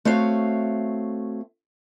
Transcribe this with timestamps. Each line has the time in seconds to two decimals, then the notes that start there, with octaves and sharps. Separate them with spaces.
0.05 A3 C4 F#4 C#5 F5